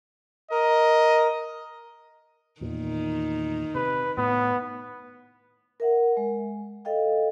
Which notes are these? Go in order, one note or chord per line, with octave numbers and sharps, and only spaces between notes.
A#4 D#5
E2 A#2 D#3
C3 B4
A2 B3
A#4 E5 F#5
G#3
A4 D#5 F5 G5